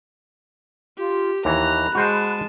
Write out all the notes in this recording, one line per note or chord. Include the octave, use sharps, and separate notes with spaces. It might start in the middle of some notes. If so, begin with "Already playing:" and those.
F4 G4
D#2 E3 A#5 B5 F#6
G#3 F#4 C5 F#5 A5